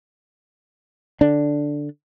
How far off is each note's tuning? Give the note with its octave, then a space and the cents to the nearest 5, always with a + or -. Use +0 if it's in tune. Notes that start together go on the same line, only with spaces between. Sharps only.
D3 +0 D4 +0